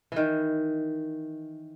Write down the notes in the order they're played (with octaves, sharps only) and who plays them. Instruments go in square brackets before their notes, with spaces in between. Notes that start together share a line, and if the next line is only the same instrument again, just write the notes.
[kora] D#3 E3